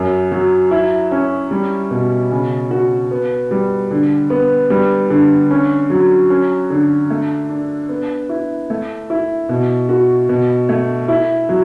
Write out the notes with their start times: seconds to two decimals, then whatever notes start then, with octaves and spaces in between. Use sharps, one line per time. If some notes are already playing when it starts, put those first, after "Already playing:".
Already playing: F#2
0.32 F#3
0.71 E4
1.11 C#4
1.51 G3
1.91 B2
2.31 C#3
2.71 F#4
3.11 B3
3.51 G3
3.91 D3
4.30 B3
4.70 G3
5.10 D3
5.51 C#4
5.90 F#3
6.30 C#4
6.70 D3
7.10 A3
7.49 D4
7.89 B3
8.29 E4
8.70 A3
9.10 E4
9.49 B2
9.89 F#4
10.29 B2
10.69 A3
11.08 E4
11.49 F#3